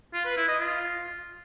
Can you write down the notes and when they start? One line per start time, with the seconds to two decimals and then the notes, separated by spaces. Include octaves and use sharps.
0.14 F4
0.25 B4
0.37 E4
0.48 D#5
0.60 F4